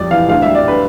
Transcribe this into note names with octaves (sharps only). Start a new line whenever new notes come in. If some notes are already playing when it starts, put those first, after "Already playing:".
Already playing: F2 G3 D5
E3 F5
D2 F5
G3 E5
D5
D3 B4